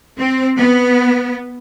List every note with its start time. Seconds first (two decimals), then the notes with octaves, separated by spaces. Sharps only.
0.19 C4
0.57 B3